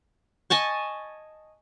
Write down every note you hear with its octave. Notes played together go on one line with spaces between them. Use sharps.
D#5 G#5 A5 C#6